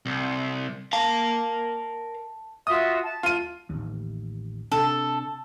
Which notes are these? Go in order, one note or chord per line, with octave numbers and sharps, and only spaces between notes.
C2
A#4 F5 A5
F4 F#4 E5 D#6
A5
F4 D#7
A1 D#2
C3 D4 A4